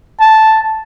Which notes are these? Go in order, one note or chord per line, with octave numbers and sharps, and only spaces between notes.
A5